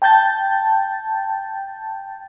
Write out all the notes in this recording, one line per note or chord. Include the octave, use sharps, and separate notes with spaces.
G5 A5 G6 A6